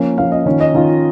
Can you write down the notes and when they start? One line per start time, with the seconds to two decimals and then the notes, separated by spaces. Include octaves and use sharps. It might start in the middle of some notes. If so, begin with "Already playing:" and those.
Already playing: F3 A#3 C#4
0.17 F3 A#3 C#4 F5
0.32 D#5
0.46 D#3 C#4 F4
0.60 D#5
0.74 D#3 C#4 F4